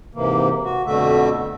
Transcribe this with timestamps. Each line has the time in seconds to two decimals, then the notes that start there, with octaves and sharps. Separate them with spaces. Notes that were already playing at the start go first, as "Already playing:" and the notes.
0.15 G#2 C3 E3 A#3
0.64 F#4
0.86 F2 B2 D3 A3 F#4 E5